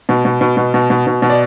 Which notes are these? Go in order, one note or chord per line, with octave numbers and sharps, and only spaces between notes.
B2
B2
B2
B2
B2
B2
B2
B2
D5